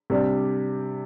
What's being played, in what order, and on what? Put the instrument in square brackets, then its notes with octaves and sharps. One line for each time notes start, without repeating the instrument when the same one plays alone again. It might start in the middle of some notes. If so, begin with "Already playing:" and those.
[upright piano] C3 G3 D4